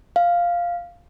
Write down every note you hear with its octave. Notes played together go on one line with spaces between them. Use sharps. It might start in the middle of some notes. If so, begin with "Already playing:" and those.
F5